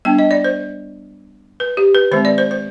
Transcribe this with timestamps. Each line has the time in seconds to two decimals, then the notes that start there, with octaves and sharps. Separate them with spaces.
0.05 G3 B3 D4 G5
0.19 D#5
0.31 D5
0.44 C5
1.60 B4
1.77 G4
1.94 B4
2.11 D#3 G#3 C4 C5
2.25 D5
2.38 C5
2.51 C5